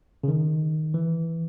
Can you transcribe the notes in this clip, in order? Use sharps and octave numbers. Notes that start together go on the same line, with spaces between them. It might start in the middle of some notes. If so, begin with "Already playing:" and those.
C#3
D#3
E3